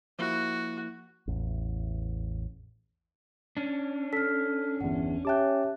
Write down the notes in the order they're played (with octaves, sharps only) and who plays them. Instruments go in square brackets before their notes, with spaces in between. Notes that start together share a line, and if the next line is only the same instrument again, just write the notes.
[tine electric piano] F3 A#3 E4 [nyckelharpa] F#4
[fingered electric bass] A1 E2
[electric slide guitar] C#4 D4
[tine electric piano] A4 [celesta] F6 B6
[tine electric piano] G1 E2 [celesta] F#5
[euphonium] C#4 [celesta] G4 E5 F#6 [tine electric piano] G5 A5 D6